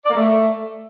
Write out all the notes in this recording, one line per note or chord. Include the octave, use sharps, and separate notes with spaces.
D5
A#3
A3